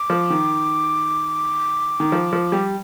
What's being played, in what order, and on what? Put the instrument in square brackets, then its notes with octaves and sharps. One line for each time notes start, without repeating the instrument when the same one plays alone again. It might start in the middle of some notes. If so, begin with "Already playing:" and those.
Already playing: [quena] D6
[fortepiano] F3
D#3
D#3
F3
F3
G3